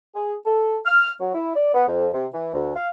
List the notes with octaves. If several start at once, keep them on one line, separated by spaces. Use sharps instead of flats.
G#4
A4
F6
F#3
E4
D5
B3
F2
C3
E3
D2
F5